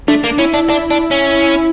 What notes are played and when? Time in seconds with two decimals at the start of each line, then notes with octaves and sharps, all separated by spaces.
0.08 A3 D4
0.24 A#3
0.38 C#4 E4
0.54 D4
0.70 D4
0.91 D4
1.11 C#4